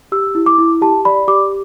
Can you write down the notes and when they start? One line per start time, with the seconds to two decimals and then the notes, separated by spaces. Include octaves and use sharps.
0.12 G4 E6
0.35 E4
0.46 D6
0.58 E4
0.81 G4 A5
1.05 D5 B5
1.28 G4 D6